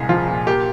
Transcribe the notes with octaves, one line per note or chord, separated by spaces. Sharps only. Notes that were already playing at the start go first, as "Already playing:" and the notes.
Already playing: C2 A#2 G#3 G#4
F3 F4
A#2
A#3 G4